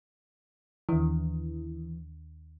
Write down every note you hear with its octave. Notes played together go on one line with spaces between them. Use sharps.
D#2 D#3 E3